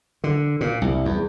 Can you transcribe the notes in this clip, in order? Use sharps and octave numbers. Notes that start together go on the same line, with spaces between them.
D3
A#2
C2
E2